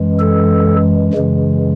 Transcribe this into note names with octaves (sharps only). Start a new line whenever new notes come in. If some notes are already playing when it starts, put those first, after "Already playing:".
Already playing: F#2 E3 G#3
A4
F#2 C#3 E3 G#3